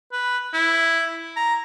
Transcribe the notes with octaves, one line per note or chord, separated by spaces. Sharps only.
B4
E4
A#5